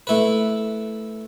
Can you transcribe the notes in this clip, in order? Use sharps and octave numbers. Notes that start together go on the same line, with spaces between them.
A3 E4 B4